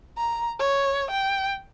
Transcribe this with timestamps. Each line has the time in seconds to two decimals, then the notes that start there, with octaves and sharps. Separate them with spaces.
0.18 A#5
0.59 C#5
1.11 G5